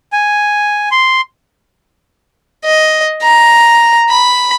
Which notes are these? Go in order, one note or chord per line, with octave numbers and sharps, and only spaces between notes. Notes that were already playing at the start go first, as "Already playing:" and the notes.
G#5
C6
D#5
A#5
B5